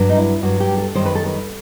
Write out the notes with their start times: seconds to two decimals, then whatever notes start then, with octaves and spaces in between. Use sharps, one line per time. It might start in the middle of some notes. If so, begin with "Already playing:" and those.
Already playing: G2 F#3
0.09 D#4
0.17 E4
0.43 G2 F#3 F#4
0.60 G4
0.78 A4
0.95 F#2 D#3 G3 C5
1.05 B4
1.15 A4
1.26 B4